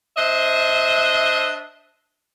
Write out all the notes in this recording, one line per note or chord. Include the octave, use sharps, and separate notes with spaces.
D4 C5 D#5 E5